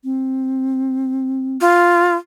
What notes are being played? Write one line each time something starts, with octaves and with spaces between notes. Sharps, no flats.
C4
F4